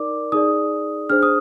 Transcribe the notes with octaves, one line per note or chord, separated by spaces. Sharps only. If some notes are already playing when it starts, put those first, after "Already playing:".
Already playing: D#4 A#4 D5 D6
D#4 G#4 D5 D#6
D4 G#4 C5 F6
D#6